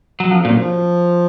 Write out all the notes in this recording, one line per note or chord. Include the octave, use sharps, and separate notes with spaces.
F#3
F#2 F3
F2
F#2 A#2
F3